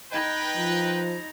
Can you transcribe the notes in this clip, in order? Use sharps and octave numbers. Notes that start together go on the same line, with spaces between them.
D#4 B4 D#5 G5 A#5 B5 G#6
F3